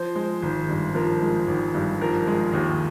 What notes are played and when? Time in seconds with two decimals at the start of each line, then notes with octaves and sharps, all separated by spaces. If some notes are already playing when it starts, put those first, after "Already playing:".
Already playing: F3 C5
0.16 G#3
0.42 G#1
0.69 G2
0.95 F3 A#4
1.22 G#3
1.48 G#1
1.74 G2
2.01 F3 A#4
2.27 G#3
2.53 D#2